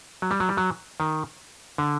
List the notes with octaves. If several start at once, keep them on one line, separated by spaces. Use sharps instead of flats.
F#3
G3
F#3
G3
F#3
D#3
D3